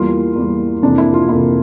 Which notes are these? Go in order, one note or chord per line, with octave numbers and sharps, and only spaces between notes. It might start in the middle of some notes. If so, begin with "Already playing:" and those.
Already playing: E2 E3 G3 A#3 F4
E2 E3 G3 A#3
F2 C3 E3 A#3 D4
E4
F4
F2 C3 E3 A#3 E4